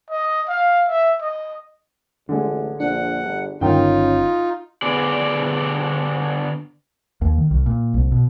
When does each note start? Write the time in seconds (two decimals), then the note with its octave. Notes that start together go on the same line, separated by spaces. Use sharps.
0.10 D#5
0.48 F5
0.88 E5
1.21 D#5
2.29 A1 D3 G#3
2.80 A#1 D4 F#5
3.24 G1
3.61 G1 D#3 C#4 D#4 F4 G5
4.82 D3 B3 D4 G#4 D5
7.21 D#2
7.38 D#3
7.51 C2
7.66 A#2
7.94 C2
8.12 B2